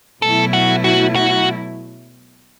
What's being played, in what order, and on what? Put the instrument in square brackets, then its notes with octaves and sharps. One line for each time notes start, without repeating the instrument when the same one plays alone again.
[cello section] B2 F#3 A3 E4 [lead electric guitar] A4
[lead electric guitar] F#4
F#4
F#4